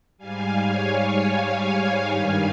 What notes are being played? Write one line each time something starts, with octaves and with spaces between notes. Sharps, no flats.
G#2 G3 F5 G#5
C#5 F5
F5 G#5
G2 D#3 G3 F5 G#5